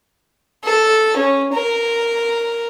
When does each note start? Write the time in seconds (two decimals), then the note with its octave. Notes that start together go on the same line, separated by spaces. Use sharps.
0.64 A4
1.16 C#4
1.53 A#4